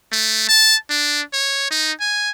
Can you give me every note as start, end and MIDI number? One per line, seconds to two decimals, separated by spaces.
0.12 0.47 57
0.48 0.75 81
0.90 1.21 62
1.33 1.69 73
1.71 1.92 63
2.00 2.31 80